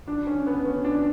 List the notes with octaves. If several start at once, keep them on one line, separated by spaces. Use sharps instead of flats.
D4
C#4
B3
C#4
D4